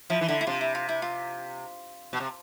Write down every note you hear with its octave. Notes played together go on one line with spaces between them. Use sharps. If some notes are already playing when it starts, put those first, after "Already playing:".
F3 E4
E3
D3 E4
E4
C3 F4
E4
F4
E4
F4
B2
C3